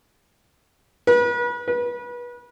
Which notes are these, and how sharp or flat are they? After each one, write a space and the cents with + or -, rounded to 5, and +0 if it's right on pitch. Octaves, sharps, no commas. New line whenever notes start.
B4 -35
B4 -30